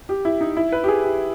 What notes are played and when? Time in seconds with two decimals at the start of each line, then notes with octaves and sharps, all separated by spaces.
0.09 G4
0.25 E4
0.41 D#4
0.57 E4
0.72 B4
0.84 G4
0.88 G#4
1.04 G4